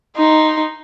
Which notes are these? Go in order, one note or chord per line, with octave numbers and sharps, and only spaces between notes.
D#4 C6